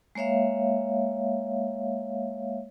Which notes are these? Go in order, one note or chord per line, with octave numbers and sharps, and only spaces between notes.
G#3 A#3 C#5 E5 F5